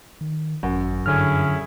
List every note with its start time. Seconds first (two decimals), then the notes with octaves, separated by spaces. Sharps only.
0.21 D#3
0.63 G#1 F#2
1.06 G2 D3 C#4 E4 G#4 F6